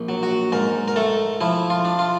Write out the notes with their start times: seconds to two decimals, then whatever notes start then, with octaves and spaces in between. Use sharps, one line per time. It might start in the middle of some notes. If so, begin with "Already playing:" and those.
Already playing: A#1
0.09 F#3
0.23 F#4
0.52 G#2 A#4
0.88 A#4
0.96 A3 A4
1.41 F3 E4
1.70 F4
1.85 D4
1.99 F4